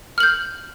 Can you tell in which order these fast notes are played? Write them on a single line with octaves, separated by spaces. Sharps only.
F6 F#7 G6